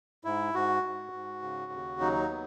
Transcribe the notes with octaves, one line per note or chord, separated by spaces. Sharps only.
G#2 E4
G#2 F#4
G#2
G#2
C#3
D#2
F#3 D#4
B3